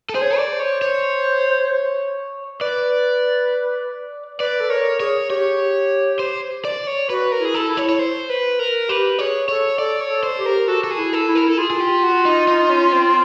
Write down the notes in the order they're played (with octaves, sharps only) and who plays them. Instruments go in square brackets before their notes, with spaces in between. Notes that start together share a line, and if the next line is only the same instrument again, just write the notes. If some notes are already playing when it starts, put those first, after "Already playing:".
[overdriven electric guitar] A4
[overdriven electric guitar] G#4 [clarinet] C5
[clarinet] C#5
[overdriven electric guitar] D5
[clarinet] C5
[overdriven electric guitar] C#5
C#5
[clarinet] B4 [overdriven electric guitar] D5
[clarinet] B4 [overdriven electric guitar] D5
[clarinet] A4
[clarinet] A#4 [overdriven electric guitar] C#5
[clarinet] G#4 [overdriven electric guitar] C#5
[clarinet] G4 [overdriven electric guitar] C#5
[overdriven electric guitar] C5
D5
C#5
[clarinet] F#4 [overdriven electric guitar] B4
[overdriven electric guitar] A#4
[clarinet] E4
[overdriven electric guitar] G#4
A4
[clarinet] E4
[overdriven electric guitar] C#5
C#5
C5
B4
A#4
[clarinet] G4 [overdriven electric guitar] B4
[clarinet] G#4 [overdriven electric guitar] C#5
[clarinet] A4 [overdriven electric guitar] C#5
[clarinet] A4 [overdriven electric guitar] D5
[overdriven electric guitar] C#5
[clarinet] A4
[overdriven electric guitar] C5
[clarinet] G4
[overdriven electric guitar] A#4
[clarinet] F#4 [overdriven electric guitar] A4
[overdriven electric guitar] A4
G#4
[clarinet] E4
[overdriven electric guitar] A4
[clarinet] E4
[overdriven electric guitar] A#4
[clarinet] E4 [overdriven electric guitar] A4
[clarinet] F4 [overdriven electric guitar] G#4
[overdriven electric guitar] G#4
G4
F#4
D#4
D#4
C#4
C4